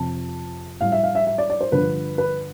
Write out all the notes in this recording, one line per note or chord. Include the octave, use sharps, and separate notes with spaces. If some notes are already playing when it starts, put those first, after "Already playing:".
Already playing: F2 C3 F3 A5
A2 G3 F5
E5
F5
E5
E5
D5
D5
C5
G2 D3 F3 B4
B4